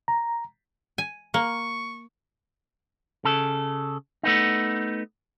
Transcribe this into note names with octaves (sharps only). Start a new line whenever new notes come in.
A#5
G#5
A#3 C#6
C#3 A4
A3 B3 D#4